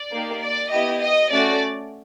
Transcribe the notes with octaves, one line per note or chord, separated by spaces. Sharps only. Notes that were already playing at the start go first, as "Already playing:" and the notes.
Already playing: D5
A#3 D#4 G4
D5
B3 E4 G4 D#5
D#5
A3 C#4 F#4 A4 D5